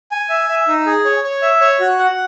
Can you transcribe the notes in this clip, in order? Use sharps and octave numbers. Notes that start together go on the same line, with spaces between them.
G#5
E5
E5
D#4
G#4
C#5
C#5
E5
C#5
F#4
F#5